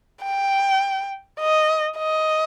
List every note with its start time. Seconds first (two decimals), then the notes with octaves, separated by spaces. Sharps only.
0.23 G5
1.40 D#5
1.98 D#5